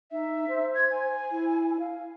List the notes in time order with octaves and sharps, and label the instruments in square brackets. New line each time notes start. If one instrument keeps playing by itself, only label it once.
[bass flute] D#4 [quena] E5
[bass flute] C5
[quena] G#6
G#5
[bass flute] E4
F5